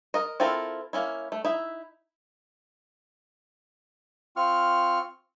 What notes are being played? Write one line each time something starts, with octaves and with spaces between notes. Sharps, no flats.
A#4 D#5
C4 E4 F4 A4 A#4
A#3 C#4 E4
A3
D#4 E4 E5
C4 F4 C#6 F6